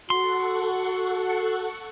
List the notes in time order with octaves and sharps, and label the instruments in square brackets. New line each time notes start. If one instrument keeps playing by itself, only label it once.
[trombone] F#4 [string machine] A4 F#5 C#6 [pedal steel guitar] C6